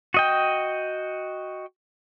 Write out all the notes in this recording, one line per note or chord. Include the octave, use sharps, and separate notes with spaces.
F#4 D#5 G5